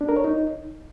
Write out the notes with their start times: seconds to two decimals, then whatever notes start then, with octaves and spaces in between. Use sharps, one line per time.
0.01 D4
0.09 A#4
0.17 C#5
0.24 D#4